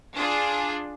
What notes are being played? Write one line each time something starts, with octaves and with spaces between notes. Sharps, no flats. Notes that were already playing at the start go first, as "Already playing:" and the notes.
D4 F4 G#4